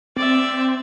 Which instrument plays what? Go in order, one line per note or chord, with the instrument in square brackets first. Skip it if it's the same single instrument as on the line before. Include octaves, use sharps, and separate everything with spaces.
[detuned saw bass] C4 [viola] D5 E5